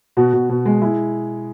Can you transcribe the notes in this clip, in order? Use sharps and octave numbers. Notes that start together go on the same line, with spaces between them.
B2 F#4
B2
B2
G#3
G#3 E4